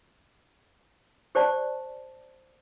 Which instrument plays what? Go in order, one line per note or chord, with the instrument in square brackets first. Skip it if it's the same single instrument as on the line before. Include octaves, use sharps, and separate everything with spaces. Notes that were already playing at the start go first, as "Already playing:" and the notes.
[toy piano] G4 C5 D5 A5